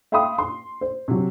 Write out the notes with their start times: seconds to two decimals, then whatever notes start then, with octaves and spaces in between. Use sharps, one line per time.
0.12 E5 F5 G5 B5 C6 D#6
0.38 C6
0.81 C5
1.08 C3 F#3